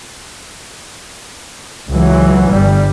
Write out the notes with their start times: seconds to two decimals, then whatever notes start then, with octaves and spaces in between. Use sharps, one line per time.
1.90 C#2 E3 F#3
2.51 G1 G3